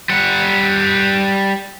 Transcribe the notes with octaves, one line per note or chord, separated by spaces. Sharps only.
G3 F#5